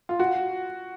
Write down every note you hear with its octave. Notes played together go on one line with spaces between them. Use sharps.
F4
F#4